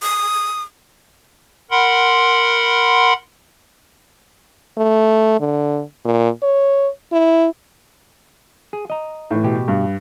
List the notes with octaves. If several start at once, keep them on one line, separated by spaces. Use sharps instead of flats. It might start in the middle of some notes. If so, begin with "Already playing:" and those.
D#6
A#4 F#5 B5 C6
A3
D3
A#2
C#5
E4
G#4
D#5 A#5
A2 E3
B2 G4
G2